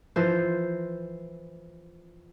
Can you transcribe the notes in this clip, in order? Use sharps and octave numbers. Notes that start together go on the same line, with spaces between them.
E3 F3 C5